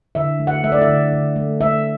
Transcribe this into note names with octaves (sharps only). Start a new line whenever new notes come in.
D3 E5
A3
F#5
A3 E5
D5
E5
D3
D3
A3
A3 E5